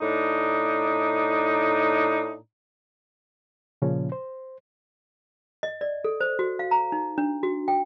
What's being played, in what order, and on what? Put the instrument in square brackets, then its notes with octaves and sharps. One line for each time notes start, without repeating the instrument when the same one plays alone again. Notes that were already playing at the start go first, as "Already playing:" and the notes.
[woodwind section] A2 D4 D#4
[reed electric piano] A#2 C#3 F3 C#4
C5
[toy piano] D#5
D5
A4
C5
F#4
F5
A#5
D#4
D4
F#4
G5